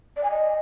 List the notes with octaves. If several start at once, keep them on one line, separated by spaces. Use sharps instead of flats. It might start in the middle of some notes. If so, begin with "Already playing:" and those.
D5
G#5
D#5